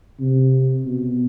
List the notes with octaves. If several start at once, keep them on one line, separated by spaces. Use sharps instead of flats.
C3
B2